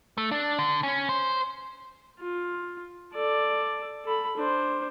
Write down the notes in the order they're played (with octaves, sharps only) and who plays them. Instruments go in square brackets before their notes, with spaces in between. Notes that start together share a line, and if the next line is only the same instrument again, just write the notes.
[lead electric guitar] A3
D4
D3
C#4
C5
[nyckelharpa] F4
A4 D5
A4 B5
D4 C5